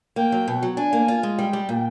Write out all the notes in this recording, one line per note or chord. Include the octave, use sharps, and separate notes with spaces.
A#3 G5
F#3
B2
F#3
D4 G#5
A#3
F4
G#3
G3 G5
G3
A#2